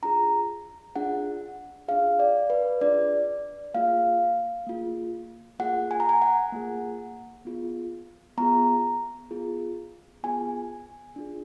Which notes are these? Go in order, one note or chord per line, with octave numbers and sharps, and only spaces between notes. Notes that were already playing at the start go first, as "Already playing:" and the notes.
D4 F4 G#4 A#5
D4 F4 G#4 F#5
D4 F4 G#4 F5
D5
B4
D4 F4 G#4 D5
A#3 F4 G#4 F5
A#3 F4 G#4
A#3 F4 G#4 F#5
G#5
A#5
G#5
F#5
A#3 F4 G#4
B3 F4 G#4
B3 F4 G#4 A#5
B3 F4 G#4
B3 F4 G#4 G#5
D4 F4 G#4